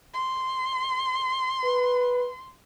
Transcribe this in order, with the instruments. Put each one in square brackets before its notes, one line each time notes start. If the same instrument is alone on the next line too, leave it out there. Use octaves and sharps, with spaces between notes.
[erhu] C6
[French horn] B4